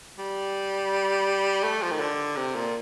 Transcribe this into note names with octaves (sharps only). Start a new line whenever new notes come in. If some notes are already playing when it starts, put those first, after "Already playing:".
G3
A3
F3
D#3
D3
C3
A#2